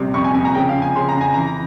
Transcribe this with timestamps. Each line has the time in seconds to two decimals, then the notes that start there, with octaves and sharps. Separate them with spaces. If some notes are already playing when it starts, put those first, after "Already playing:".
Already playing: A#1 C3 G3
0.14 F2 C#6
0.24 G#5
0.35 F2 G#5
0.45 A#5
0.55 C#3 G5
0.69 F5
0.75 F2
0.82 G#5
0.96 C#3 C6
1.09 A#5
1.16 F2 G#5
1.34 E3 A#5